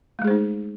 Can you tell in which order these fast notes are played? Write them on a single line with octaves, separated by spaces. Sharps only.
A3 G#3 G#4 C5 D#4